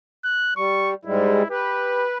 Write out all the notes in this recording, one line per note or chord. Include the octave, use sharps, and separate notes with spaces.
F#6
G3 C#6
G#2 G3 G#3 E4
G4 B4